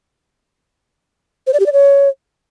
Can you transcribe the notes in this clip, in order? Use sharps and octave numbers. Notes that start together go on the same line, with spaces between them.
C5
D5
G4
D5
C#5